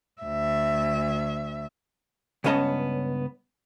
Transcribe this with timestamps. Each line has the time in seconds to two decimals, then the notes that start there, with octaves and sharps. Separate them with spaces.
0.22 D2 E5
2.44 C#2 G2 B3 C#4 D#5 A5